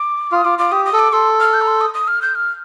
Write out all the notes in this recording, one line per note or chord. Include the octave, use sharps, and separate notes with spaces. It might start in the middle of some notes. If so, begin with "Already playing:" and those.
Already playing: D6
F4 D#6
F4 D6
F4 D6
G4 D#6
D#6
A4
D6
A4 C6
F6
G6
A#5
C6
D#6
D#6
F6
G6
F6